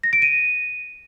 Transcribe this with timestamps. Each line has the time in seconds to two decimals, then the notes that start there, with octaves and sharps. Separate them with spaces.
0.03 A#6
0.13 D7
0.22 D#7